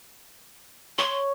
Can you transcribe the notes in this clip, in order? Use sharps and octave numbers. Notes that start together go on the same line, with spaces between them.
C#5 C6